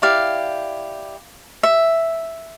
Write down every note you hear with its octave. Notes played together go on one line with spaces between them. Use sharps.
E4 G4 D5 F5
E5